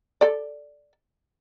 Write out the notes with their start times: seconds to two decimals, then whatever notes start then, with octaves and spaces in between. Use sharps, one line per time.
0.21 A4 D5